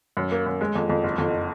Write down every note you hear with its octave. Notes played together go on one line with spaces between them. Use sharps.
F#2
A#3
F#2
G#3
F2
F2
F#1
F2